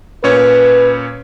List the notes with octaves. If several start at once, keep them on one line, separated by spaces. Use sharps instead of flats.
A#2 C#4 B4 C#5